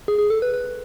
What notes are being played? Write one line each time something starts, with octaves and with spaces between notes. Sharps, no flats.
G#4
G#4
A4
B4
B4